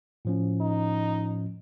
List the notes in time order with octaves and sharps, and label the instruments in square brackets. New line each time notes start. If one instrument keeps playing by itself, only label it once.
[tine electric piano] A2 F3 C#4
[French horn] D#4